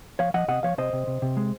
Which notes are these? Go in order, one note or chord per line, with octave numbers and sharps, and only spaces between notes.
F3 C#5 F5
F3 D#5 F#5
C3 D#5 F#5
F3 C#5 F5
C3 C5 D#5
C3
C3
C3
G#3